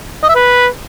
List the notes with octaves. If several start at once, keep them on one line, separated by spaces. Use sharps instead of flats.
D#5
E5
B4